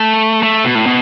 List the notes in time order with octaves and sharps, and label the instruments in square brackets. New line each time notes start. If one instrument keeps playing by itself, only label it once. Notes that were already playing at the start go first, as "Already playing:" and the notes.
Already playing: [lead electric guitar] A3
A3
B2
A2
B2